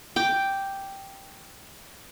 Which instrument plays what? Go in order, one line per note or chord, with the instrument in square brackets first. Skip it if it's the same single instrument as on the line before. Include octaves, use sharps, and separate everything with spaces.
[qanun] G5 D6